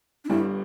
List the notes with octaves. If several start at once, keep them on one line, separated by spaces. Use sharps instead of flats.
D4
G1 G2 G3 E4